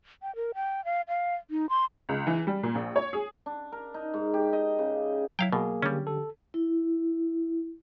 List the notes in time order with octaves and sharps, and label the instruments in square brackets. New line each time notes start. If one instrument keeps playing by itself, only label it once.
[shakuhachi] G5
A#4
G5
F5
F5
D#4
C6
[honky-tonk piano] C#2
E3
G3
A#2
A#1
C#5
G#4
[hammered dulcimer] D4
A#4
D#4
G#2
G4
D#5
C#3
[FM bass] F#3 [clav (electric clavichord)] E4 F5 G5
[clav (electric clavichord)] B2 [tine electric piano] A#3 G#4
[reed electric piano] D3 G4 [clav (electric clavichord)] G3 C#4
[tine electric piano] A4
[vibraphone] E4